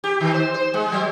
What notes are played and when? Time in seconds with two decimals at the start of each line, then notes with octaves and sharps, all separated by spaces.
0.04 G4
0.21 D#3
0.34 C5
0.54 C5
0.74 G#3
0.92 F#3